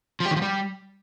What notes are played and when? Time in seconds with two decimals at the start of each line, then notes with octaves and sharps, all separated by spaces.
0.20 F3
0.26 G4
0.31 D#3
0.36 F3
0.42 G3